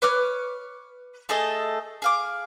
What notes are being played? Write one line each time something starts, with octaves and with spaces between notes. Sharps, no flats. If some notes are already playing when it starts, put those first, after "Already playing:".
B4 C#5 D6 F6
A3 G#4 A4 D#5
G#4 F5 D6